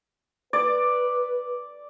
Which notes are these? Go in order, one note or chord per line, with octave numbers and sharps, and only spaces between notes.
B4 D5